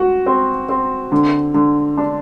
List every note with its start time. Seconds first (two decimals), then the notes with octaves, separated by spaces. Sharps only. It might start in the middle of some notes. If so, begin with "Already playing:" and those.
Already playing: F#4
0.26 C4
0.69 C4
1.12 D3
1.54 D3
1.97 D4